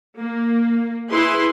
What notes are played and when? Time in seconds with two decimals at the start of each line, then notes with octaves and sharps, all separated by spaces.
0.21 A#3
1.11 E4 G#4 B4 C6